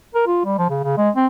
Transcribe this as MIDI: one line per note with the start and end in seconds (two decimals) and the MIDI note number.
0.15 0.24 70
0.27 0.41 65
0.45 0.58 55
0.58 0.66 53
0.70 0.80 49
0.84 0.95 49
0.97 1.10 56
1.16 1.27 60